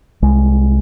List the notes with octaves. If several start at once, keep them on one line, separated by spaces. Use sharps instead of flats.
C2 G#3